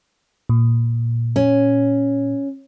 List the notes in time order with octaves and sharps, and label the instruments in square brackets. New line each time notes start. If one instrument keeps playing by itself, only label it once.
[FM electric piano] A#2
[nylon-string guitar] C#4